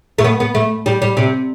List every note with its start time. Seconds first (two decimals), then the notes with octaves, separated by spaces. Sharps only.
0.18 A3
0.24 B3
0.40 B3
0.55 A3
0.86 G3
1.02 G3
1.17 C3